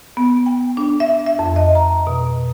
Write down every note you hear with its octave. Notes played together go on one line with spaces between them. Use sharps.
B3
G5
D4
E5
E5
F2
D#5
A#5
B2